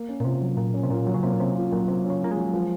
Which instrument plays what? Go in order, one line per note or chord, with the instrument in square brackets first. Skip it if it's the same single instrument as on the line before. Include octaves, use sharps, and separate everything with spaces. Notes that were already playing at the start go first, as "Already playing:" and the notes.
Already playing: [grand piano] A#3
C#4
[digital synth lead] A#2
[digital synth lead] C3 [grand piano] F4
[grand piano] F#3
[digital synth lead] A#2 [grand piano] A#3
[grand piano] C#4
[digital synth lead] C3
[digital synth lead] A#2 [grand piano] F4
[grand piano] F#3
[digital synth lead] C#3
[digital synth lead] C3 [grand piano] A#3
[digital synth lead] A#2
[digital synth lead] C3 [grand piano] C#4
[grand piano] F4
[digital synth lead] A#2 [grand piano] F#3
[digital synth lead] C3 [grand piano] A#3
[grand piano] C#4
[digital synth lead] C#3
[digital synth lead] A#3 [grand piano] F4
[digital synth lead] G#3
[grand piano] F#3
F3